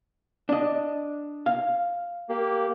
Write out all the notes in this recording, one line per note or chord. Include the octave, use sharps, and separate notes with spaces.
D4 D#5
F5
A#3 G4